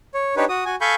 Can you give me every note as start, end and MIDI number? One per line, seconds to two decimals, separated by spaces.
0.14 0.35 73
0.37 0.45 62
0.37 0.45 63
0.37 0.45 67
0.37 0.45 71
0.37 0.45 73
0.49 0.64 66
0.49 0.64 87
0.66 0.75 66
0.66 0.75 80
0.81 0.95 69
0.81 0.95 77
0.81 0.95 80
0.81 0.95 83
0.81 0.95 85
0.81 0.95 91